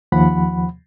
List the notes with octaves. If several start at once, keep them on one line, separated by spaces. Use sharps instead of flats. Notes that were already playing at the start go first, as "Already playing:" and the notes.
D#2 F3 F#5 B5